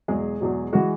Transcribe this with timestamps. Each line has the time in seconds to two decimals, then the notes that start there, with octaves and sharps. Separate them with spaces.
0.08 E2 B2 F#3 G#3 G#4
0.40 E2 B2 F#3
0.73 E3 G#3 F#4